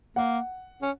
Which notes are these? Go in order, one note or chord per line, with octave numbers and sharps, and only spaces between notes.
A#3 F#5
C#4